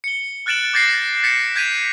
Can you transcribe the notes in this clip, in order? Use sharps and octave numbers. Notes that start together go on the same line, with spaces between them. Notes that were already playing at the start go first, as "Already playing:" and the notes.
C#7 G7
F6 F#6 A6 D7 E7 F#7
D6 G6 A6 A#6 C7
A6 A#6
G6 A6 B6 C#7 E7
G6 G#6 B6 D#7 F7